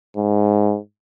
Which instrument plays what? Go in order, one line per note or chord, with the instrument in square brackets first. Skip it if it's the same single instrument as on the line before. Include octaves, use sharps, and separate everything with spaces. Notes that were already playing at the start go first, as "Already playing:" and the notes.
[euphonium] G#2